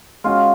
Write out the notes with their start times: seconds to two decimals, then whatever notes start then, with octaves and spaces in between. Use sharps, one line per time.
0.24 G#3 C#4 F4 F#4